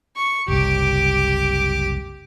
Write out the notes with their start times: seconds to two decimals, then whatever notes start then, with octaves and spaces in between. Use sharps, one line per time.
0.17 C#6
0.48 F#1 C2 G4 D6